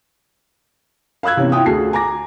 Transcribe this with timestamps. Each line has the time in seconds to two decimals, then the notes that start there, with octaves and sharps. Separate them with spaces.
1.23 F5 B5 E6 F#6 G#6
1.37 C3 E3 B3 C#4
1.52 E4 F4 G5 D#6
1.66 D2 F#4 G#4 A5 C7
1.93 G#5 A#5 D6 A#6